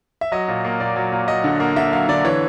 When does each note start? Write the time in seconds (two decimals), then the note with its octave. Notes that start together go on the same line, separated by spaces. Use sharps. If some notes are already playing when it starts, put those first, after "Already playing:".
0.21 E5
0.32 F#3 D#5
0.48 A#2
0.65 A#3
0.80 A#2 D5
0.96 F#3
1.12 A#2
1.28 F#3 D#5
1.44 D3
1.60 A#3
1.76 D3 E5
1.92 F#3 F5
2.08 D3 D5
2.25 E3 C#5